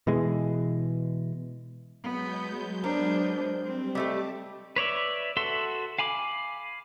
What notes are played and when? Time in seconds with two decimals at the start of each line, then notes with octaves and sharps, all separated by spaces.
0.07 B2 E3 G#3
2.04 F#3 G#3 B3 G6
2.84 B3 D4 A#4 C5
3.64 G3 C4
3.95 G3 A3 G4 D#5 A5 D6
4.76 B4 C#5 D5 E5
5.37 F#4 A4 E5 C6
5.99 F5 G#5 B5 D6